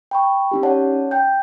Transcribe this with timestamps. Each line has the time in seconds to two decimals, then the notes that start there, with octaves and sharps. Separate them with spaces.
0.11 G5 B5 C#6
0.51 C#4 D#4 G4
0.63 C#5 D5 F#5 A5
1.11 G5 G6